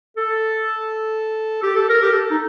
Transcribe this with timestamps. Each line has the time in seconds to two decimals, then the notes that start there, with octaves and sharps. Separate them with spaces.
0.17 A4
1.63 G4
1.76 A4
1.89 A#4
2.02 G4
2.12 A4
2.31 D#4